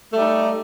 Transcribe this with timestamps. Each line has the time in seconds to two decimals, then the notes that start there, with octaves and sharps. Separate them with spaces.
0.13 A3
0.16 G3
0.19 D#4